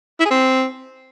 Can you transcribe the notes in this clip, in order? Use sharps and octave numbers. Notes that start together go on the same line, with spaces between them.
E4
G#4
C4